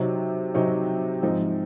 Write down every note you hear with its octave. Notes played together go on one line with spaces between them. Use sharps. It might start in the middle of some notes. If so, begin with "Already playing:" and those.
Already playing: C3 F#3 C4 D#4
C3 F#3 C4 D#4
G#2 F3 C4 D#4